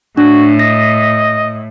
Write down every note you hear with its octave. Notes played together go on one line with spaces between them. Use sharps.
A2 D4 F#4
D#5 A#6